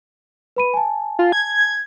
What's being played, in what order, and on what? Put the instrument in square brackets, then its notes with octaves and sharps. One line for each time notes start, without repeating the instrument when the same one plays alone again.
[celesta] B4 B5 D#7
G#5 A5
[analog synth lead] F4
G#6